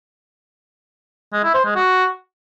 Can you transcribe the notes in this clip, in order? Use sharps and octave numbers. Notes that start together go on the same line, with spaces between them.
G#3
E4
C5
G#3
F#4